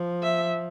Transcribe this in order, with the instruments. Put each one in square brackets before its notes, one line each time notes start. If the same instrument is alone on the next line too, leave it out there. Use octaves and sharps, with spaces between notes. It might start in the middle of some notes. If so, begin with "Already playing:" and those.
Already playing: [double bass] F3
[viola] E5